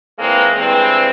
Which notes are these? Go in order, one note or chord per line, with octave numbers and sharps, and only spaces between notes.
A#2 E3 G#3 A#3 C4
G2 E3 G#3 C4